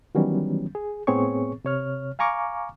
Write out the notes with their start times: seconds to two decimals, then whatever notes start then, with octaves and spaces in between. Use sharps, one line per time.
0.15 D#3 E3 F#3 G3 B3 C#4
0.75 G#4
1.07 A2 B3 C4 G#4 C#5 C#6
1.65 C3 C#5 F6
2.19 F5 G#5 A#5 C#6 D6 F6